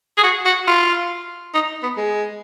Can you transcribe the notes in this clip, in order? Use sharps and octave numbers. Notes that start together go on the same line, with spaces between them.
G#4
F#4
F#4
F4
D#4
B3
G#3